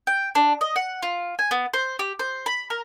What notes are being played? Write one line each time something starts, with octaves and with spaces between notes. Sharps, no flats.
G5
D4
D#5
F#5
F4
G#5
B3
C5
G4
C5
B5
A#4